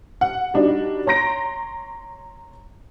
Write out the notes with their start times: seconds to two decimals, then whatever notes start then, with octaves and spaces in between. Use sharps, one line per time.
0.21 F#5
0.54 G3 D4 D#4 F#4
1.07 C#5 A#5 C6 A#6 D7